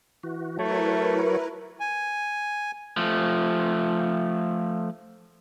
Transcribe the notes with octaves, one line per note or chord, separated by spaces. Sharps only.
E3 F#4
F#3 A3 E4 A#4 B4 C#5
G#5
F3 A3